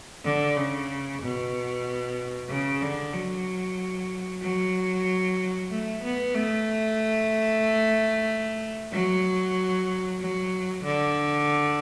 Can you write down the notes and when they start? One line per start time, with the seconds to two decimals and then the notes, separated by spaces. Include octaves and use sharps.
0.25 D3
0.57 C#3
1.21 B2
2.49 C#3
2.82 D3
3.14 F#3
4.42 F#3
5.71 A3
6.03 B3
6.35 A3
8.92 F#3
10.21 F#3
10.84 D3